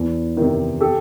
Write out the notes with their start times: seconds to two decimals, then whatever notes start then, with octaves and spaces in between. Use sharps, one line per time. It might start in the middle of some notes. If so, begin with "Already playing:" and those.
Already playing: E2
0.37 C3 D#3
0.81 G4 A4